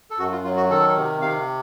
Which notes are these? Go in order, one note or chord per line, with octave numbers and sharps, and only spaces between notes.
A4
F#2 F#4
F4
F#3 F4
F#4
D#3 A4
C3
C3 F5